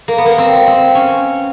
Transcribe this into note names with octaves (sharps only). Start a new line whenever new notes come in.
A#3
B3
A#3
C4
C4
C#4